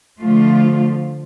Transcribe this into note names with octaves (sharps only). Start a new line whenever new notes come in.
D3 F3 A3 F4